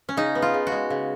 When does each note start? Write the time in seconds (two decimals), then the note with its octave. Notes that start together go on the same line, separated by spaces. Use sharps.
0.09 C#4
0.17 C#3 D#4
0.35 B3
0.42 F4
0.54 C#3
0.67 F#4
0.72 G#3
0.90 C#3